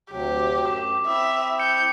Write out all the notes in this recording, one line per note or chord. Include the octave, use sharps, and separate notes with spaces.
D2 C3 F#3 G4
F#2 D6
C4 E4 E5 D#6
G6 C#7